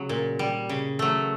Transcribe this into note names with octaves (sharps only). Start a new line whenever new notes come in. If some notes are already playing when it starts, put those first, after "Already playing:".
Already playing: C#3 F#3
A#2
G3
C#3
F#3 A3